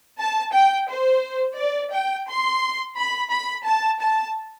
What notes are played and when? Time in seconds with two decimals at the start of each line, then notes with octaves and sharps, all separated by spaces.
0.19 A5
0.53 G5
0.89 C5
1.58 D5
1.93 G5
2.28 C6
2.97 B5
3.31 B5
3.67 A5
4.01 A5